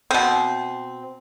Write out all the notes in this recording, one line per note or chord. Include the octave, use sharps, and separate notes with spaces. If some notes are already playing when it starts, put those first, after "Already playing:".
B2 C4